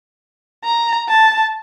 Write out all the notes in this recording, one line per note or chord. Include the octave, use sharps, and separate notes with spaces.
A#5
A5